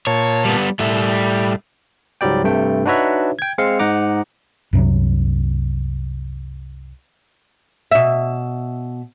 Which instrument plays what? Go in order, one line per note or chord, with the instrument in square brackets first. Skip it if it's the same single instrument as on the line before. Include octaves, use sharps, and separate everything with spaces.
[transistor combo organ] A#2 A5 [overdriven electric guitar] C#5
[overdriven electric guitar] G3 B3
[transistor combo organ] A2 [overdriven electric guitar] G3 E5
[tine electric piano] C#2 G#2 F#3 G3 D5 G5
G2 C3 A3 G5
D4 D#4 F#4 B4 C#5 E5
G5 G#6
G#3 C4 F5 C#7
G#2 D#4 F#5 A#5 D6
[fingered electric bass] C2 F#2 C3 F#3
[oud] B2 E5